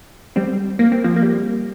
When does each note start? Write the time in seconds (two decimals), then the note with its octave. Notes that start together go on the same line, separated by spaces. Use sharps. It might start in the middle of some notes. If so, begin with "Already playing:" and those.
0.36 G3 C4
0.79 A#3
0.92 C4
1.04 F3 A#3
1.16 A#3
1.22 G3